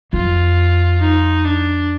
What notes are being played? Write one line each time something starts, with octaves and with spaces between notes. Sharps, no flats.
F2 F4
D#4
D4